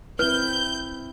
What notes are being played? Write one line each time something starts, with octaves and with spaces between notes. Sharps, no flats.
C4 E4 B4 G6